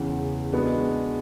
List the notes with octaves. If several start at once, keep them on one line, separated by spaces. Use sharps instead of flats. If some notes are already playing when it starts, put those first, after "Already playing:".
Already playing: E2 C#3 E3
G#3 B3 D4 F#4